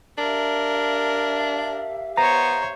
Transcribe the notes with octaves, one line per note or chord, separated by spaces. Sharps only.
D4 G4 A#4 E5 F5
B3 C5 C#5 A#5